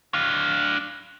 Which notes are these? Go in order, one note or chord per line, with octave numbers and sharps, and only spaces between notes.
D4 F5